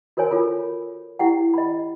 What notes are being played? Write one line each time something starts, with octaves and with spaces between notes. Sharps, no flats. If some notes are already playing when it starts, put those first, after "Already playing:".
F#4 A#4 C5 C#5 G#5
F4 A4 A#4 B5
E4 G4 F#5 G5
D#5 B5